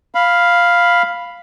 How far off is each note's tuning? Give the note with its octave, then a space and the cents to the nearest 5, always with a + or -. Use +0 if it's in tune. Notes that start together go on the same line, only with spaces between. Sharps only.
F5 +0 B5 +0